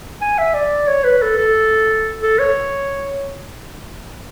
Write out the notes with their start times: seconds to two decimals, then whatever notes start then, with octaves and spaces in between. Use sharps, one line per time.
0.21 G#5
0.38 E5
0.54 D5
0.87 C#5
1.04 B4
1.22 A4
1.38 A4
2.22 A4
2.39 C#5